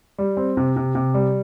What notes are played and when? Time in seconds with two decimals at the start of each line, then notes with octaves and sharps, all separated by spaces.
0.18 G3
0.37 C4
0.57 C3
0.76 C3
0.95 C3
1.14 G3